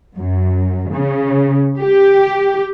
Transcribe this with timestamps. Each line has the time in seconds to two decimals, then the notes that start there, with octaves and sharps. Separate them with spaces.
0.18 F#2
0.93 C#3
1.78 G4